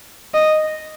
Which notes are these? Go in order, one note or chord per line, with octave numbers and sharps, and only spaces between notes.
D#5